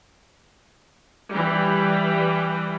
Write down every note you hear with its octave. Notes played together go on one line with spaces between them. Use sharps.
E3 G3